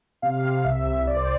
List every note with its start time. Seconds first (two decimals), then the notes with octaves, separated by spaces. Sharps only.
0.22 C3 F5
0.44 C3
0.64 C2 E5
0.86 C2
1.06 C2 D5
1.16 C5